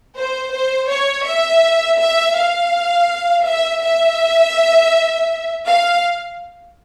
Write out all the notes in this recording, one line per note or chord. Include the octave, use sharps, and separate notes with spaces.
C5
C5
C#5
E5
E5
F5
E5
E5
F5